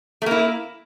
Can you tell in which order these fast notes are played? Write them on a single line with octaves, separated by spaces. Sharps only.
A3 A#3 E4